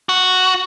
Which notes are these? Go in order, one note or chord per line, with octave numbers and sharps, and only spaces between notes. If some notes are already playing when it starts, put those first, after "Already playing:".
F#4